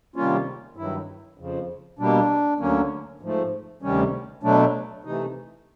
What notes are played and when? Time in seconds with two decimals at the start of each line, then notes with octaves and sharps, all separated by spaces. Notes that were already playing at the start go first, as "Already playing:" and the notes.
0.16 C3 D#3 G3 A#3 C#4 F4
0.76 G2 D#3 F#3 E4
1.38 F2 C#3 F3
1.99 B2 G3 A#3 D4
2.60 D2 D3 F#3 A#3 C#4
3.21 G#2 F3 A3
3.82 D2 C3 D#3 G3 C#4
4.43 B2 F#3 A3 D4
5.04 C3 E3 A3 D#4